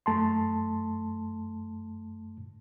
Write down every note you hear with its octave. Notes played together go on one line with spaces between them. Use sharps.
F#2 A3 A5 C6